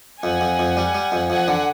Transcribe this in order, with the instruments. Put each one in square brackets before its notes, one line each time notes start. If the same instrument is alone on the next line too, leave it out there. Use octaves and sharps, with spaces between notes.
[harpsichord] F2 [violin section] F#5 G#5
[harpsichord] F2
F2
G3
G3
F2
[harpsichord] F2 [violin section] F#5 G#5
[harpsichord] D3